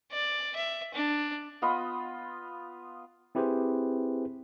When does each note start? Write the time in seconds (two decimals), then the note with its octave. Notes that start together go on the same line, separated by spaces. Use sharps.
0.12 D5
0.56 E5
0.94 D4
1.62 B3 F4 D#5 B5
3.35 C4 E4 G4 G#4 B4 C5